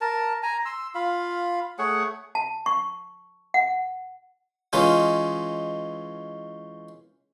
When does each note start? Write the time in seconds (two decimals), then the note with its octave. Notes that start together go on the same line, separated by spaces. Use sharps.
0.01 A#4 A5
0.43 G#5 A#5
0.65 C6 E6
0.95 F4 F5 B5
1.79 A3 G#4 C#5 F#5
2.35 A5
2.66 C#6
3.54 F#5
4.73 E3 G#3 C#4 D#4 F4